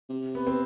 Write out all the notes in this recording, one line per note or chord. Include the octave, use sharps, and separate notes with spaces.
C3
B3
C4